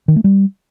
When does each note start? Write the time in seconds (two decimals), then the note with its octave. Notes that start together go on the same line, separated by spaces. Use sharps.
0.08 D#3
0.16 A3
0.24 G3